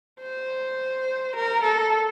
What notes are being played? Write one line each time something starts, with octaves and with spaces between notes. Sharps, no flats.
C5
A#4
A4